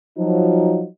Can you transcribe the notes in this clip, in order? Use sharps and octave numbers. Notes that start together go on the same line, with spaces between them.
F3 F#3 D#4